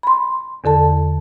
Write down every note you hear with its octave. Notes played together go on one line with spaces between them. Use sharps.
B5 C6
E2 D3 A4 A5